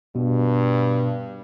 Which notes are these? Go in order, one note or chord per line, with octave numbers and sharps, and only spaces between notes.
G2 B2